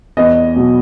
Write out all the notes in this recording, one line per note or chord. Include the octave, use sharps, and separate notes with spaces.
E2 D#5
B2 F#3